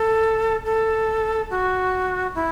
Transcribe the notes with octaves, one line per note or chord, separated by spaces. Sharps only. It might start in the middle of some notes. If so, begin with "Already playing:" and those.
Already playing: A4
A4
F#4
E4